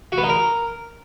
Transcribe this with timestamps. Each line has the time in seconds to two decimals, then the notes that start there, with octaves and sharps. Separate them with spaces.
0.12 F#4
0.18 B3
0.23 D#4
0.29 A#4